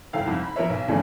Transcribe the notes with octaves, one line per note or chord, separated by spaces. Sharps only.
F#1 C2 A4 F5 G5
C2 F2 G#2
B5
F3 A#4 B4 C#5 E5
B1
D#2 C#3 E3 F3 A3 D4